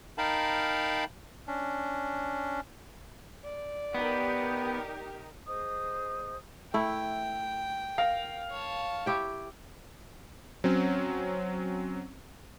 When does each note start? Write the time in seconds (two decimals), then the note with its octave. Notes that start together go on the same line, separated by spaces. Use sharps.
0.18 D#4 A#4 F5 G5 A5 B5
1.48 C#4 D4
3.44 D5
3.94 B3 D#4 G4 A#4
5.48 G#4 C5 D#5 D#6
6.74 A3 E4 G5
7.98 A#4 F5
8.50 C#5 A5
9.06 E4 G4 G5
10.64 F#3 C4 C#4